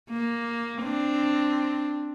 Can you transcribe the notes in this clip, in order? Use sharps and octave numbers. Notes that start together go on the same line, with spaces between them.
A#3
C4 D4